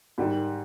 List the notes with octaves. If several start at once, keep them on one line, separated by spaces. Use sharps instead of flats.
G#2 D#3 G3